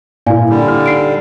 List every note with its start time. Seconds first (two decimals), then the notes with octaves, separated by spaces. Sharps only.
0.26 A#2 E4 D5 F5 G#5
0.49 D3 G3
0.68 F6
0.86 D#4 C7 D7